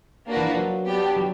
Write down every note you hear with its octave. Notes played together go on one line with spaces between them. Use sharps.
A#3 D4 F#4 B4
E3
F3
F#3
B3 D4 G4
F#3